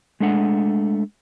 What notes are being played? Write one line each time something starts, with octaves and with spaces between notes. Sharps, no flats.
G#3 A3 D4 F#5